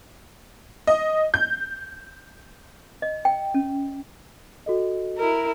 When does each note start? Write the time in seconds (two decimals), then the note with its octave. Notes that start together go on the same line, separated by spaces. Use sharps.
0.87 D#5
1.34 G6
3.02 D#5
3.25 G5
3.54 C#4
4.66 F#4 A4 D#5
5.17 E4 A#4